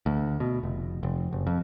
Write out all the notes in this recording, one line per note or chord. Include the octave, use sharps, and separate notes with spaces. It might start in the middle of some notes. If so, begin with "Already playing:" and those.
D2
B2
F1
F1
F#1
F2